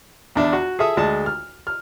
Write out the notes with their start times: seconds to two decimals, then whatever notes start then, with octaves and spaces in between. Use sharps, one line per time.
0.36 E2 D4 E5
0.53 F#4
0.79 G#4 A4 E5 D#6
0.97 D2 G#3 A5
1.26 F6
1.67 F6